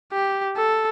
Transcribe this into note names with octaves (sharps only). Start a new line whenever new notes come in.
G4
A4